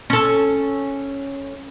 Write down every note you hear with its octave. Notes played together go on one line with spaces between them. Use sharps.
C#4 A4